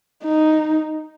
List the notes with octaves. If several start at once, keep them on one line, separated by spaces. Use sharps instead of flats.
D#4